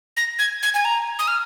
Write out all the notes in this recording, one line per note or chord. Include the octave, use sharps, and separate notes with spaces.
A#6
G#6
G#6
G#5
A#5
D#6
F6